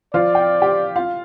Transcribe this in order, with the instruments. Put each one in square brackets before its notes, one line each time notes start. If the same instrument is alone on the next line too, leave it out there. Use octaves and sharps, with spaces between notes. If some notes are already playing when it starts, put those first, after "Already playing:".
[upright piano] F3 F4 [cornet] D5
[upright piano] G5
G4 G5
F4 F5